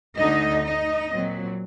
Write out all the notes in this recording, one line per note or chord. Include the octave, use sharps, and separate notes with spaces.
D2 D3 A3 D#4 D#5
D#4 D#5
A#2 F#3 C4